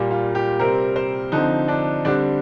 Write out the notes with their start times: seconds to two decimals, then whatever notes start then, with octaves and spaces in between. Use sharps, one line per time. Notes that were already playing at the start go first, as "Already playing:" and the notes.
Already playing: A#2 G3 A#3
0.11 F4
0.35 G4
0.59 C3 G3 C4 A#4
0.96 C5
1.32 D3 F3 C4 D#4
1.68 D4
2.05 D3 G3 C4 D4